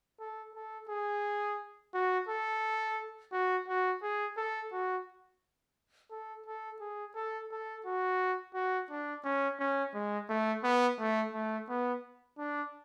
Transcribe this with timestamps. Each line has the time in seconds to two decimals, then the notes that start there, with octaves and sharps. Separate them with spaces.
0.20 A4
0.55 A4
0.90 G#4
1.94 F#4
2.28 A4
3.33 F#4
3.68 F#4
4.03 G#4
4.37 A4
4.72 F#4
6.11 A4
6.46 A4
6.81 G#4
7.15 A4
7.51 A4
7.86 F#4
8.55 F#4
8.91 D4
9.24 C#4
9.59 C#4
9.94 G#3
10.29 A3
10.63 B3
10.99 A3
11.33 A3
11.69 B3
12.38 D4